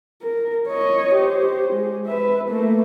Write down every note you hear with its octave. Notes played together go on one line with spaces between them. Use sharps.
A#4
C#5 D#5
G4 C5
G#3
B4 E5
A3 A#3